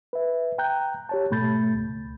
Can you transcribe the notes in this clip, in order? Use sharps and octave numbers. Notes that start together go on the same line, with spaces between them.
B4 E5
G5 A#5 F#6 G6
G4 C#5 A5
G#2 B2 A3 B5 G6 A6
C#2